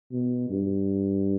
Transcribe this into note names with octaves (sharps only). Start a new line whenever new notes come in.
B2
G2